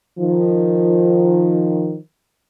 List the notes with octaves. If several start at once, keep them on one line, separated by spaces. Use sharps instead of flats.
D#3 F3